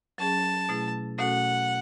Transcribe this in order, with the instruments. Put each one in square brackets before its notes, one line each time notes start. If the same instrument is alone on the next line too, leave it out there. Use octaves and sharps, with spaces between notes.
[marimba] F#3 C#4 G#4 [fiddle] A5
[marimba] B2 A3 E4 G#4
[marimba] B2 A3 C#4 F#4 A4 [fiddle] F#5